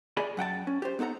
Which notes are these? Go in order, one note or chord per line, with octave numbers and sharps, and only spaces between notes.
G#4 D5 G#5 B5
F#2 F#5 G5 A5
C#4
G4 C5
B3 D#4 A4 F#5 A#5